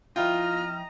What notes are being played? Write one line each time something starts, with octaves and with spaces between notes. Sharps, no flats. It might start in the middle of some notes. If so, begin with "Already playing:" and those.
F3 E4 F4 D#5 G5 A#5 F6